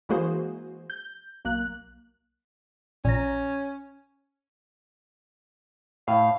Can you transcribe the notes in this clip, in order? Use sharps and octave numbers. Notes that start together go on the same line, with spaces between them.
E3 G#3 A#3 F#4 G#4 C5
G6
B1 A#3 F#6
A#1 C#4 A#5
A2 F5